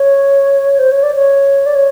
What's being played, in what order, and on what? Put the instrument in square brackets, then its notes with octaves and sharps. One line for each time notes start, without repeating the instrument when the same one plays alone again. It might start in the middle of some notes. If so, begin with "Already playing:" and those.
Already playing: [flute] C#5
C5
C#5
D5
C#5
D5
C#5